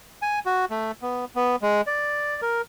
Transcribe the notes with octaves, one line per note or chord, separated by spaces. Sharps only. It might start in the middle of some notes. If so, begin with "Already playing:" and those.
G#5
F#4
A3
B3
B3
G#3
D5
A#4